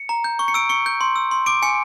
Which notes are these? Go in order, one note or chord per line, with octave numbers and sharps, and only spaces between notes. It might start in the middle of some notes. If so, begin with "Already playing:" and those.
Already playing: C#7
A#5
G6
C#6
C#7
E6 D7
C#6 C#7
G6
C6
E6
C6
D6 D7
G#5 C#7